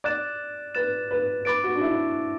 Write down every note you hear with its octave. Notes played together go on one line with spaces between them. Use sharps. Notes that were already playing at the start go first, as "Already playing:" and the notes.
D5 F#6 A6 E7
B4 F#6 A6 E7
B4
B4 B5 D6 A6 D7
F#4
D4
E4